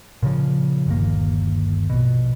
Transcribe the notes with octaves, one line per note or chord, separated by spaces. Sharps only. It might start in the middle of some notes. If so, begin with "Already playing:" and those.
A#2 C#3 F3
G1 D#2 A#3
A#1 B2